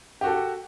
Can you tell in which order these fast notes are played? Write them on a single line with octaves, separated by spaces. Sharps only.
G4 F#4 A4